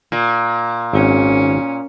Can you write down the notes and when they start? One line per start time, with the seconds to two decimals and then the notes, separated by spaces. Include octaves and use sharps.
0.12 A#2
0.93 G#1 C#4